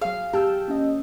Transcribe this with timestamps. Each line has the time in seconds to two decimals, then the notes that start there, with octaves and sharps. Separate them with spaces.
0.01 F#3 G#4 F5
0.33 G4 G5 A5 E6 G6
0.68 A#3 C#4 D#5